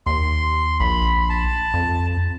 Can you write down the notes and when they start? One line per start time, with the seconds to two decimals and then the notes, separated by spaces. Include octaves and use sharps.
0.06 D#2 C6
0.80 A#1 B5
1.30 A5
1.74 F2